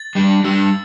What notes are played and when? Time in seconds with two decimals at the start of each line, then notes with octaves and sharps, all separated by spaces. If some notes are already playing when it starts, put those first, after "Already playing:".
Already playing: A6
0.15 G3 D4 G4
0.44 G3 D4 G4 E6